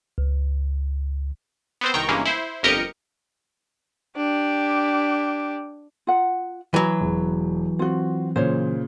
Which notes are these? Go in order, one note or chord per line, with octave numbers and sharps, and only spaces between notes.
C#2
B3 C4 C5
C2 D#3 G5 A#5 C#6
G1 E3 G#3 A#3 C#4
E4 C5
G1 F2 G4 A#4 D#5 C#7
D4 G4
F4 F#5
E3 F#3 B4
E1
C4 F4 F#4
A#2 C#3 C5 C#5